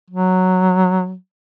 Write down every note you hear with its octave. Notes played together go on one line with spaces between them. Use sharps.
F#3